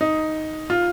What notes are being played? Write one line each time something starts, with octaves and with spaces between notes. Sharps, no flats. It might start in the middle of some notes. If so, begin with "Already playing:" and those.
D#4
F4